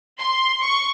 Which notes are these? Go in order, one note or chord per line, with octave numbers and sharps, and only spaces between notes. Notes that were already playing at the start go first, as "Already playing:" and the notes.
C6
C#6